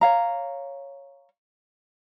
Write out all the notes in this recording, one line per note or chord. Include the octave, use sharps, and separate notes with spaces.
C#5 F5 A#5